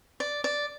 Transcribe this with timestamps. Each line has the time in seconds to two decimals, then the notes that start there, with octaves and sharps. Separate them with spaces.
0.20 D5
0.44 D5